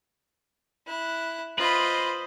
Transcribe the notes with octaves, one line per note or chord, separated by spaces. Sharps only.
E4 F#6
F4 B4 C5 D#5 B5